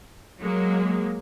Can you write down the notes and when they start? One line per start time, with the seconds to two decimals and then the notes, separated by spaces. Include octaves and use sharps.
0.40 F#3 G#3 A#3